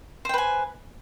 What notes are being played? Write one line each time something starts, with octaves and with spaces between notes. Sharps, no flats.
B4 C5 G5 G#5